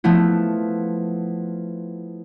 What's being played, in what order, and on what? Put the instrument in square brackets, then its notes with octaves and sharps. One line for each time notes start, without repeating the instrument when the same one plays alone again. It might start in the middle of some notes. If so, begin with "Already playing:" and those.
[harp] F3 A3 B3 E4